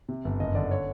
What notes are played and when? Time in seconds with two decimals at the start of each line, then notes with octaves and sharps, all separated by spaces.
0.09 C3
0.25 G1
0.40 F#1 D#5
0.55 D3 D5
0.71 C#5